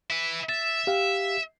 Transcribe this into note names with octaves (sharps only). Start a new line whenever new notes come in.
E4 B4
E5 A6
G4 F5